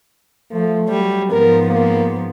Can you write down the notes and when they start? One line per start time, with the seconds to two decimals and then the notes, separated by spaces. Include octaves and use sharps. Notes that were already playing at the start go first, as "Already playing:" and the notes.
0.51 F3 A3
0.88 F#3 G3
1.32 G#2 F3 B3 A#4
1.67 A#3